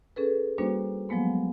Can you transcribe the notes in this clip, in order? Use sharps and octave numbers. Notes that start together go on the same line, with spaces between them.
C#4 G#4 A4 B4
G3 A#3 C#4 D4 F#4 C5
F3 F#3 G#3 A#3 B3